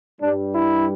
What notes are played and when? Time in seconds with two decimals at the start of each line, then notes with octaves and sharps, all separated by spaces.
0.20 G2 G3 D4
0.55 E4